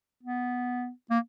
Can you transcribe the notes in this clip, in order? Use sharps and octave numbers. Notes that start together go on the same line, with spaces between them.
B3
A#3